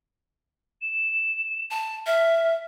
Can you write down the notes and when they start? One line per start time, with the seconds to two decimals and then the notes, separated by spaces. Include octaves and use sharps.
0.81 E7
1.71 A5
2.06 E5 F6